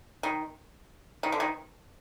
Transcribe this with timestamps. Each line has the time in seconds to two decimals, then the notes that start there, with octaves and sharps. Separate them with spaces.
0.23 D#3
1.23 D#3
1.32 D3
1.40 D#3